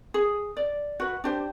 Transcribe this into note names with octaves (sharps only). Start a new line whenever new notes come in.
G#4
D5
F#4 B4
D4 G4 C5